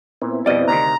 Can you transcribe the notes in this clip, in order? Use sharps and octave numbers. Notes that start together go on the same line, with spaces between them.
A#2 B3 C4 E4
F2 B2 G3 D5 D#5
D2 C3 D#3 A#5